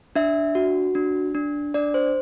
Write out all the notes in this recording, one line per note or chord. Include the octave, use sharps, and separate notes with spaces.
D4 E5
F#4
D4
D4
D4 D5
C5